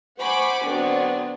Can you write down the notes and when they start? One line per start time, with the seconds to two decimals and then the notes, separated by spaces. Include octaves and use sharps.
0.19 C5 F#5 G#5 B5 C#6 D6
0.66 D3 F#3 B3 C4 D4